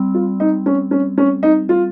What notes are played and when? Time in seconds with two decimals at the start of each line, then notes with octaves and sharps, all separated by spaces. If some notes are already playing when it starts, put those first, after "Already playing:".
Already playing: G3 C4
0.14 F4
0.40 D#4
0.66 C#4
0.91 C#4
1.18 C#4
1.43 D#4
1.69 F4